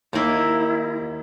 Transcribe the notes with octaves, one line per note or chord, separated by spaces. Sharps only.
D#2 D#3 A#3 E4